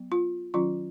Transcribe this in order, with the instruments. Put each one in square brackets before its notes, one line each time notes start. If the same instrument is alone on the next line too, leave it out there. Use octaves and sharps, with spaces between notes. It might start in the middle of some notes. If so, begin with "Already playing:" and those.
Already playing: [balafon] F#3 B3
F4
D#3 F#3 C#4 F4